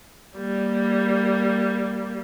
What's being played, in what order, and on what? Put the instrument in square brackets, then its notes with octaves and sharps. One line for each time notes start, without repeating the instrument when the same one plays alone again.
[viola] G3 A#3